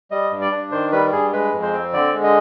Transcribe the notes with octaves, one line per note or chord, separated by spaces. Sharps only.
G3 D#5
G2
D5
D4
D#3 C5
G3 B4
G2 G#4
G#3 B4
F2
C5
C4
D3 D5
G#3
D#5